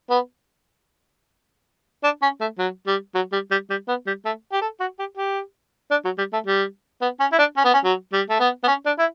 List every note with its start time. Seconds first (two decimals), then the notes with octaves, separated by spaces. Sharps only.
0.10 B3
2.04 D4
2.22 C#4
2.41 A3
2.59 F#3
2.87 G3
3.15 F#3
3.32 G3
3.51 G3
3.70 G3
3.88 B3
4.06 G3
4.25 A3
4.52 G4
4.61 A4
4.80 F#4
4.99 G4
5.17 G4
5.91 D4
6.05 F#3
6.18 G3
6.33 A3
6.46 G3
7.02 B3
7.20 C#4
7.32 E4
7.38 D4
7.57 C#4
7.65 B3
7.73 C#4
7.84 F#3
8.12 G3
8.30 A3
8.40 B3
8.64 B3
8.67 C#4
8.86 D4
8.99 E4